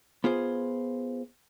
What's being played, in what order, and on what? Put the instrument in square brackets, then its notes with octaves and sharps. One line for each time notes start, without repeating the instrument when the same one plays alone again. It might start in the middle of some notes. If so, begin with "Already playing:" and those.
[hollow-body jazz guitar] B3 F4 G#4 C5